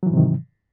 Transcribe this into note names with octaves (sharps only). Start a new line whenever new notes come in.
G#2 C3 D#3 E3 F#3